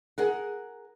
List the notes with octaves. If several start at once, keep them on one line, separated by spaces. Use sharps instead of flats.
G#4 A#4 F#5